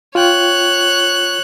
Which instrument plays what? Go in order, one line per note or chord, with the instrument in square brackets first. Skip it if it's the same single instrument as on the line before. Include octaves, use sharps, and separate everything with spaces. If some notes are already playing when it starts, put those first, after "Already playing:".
[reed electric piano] F4 G5 [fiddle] C#5 F#6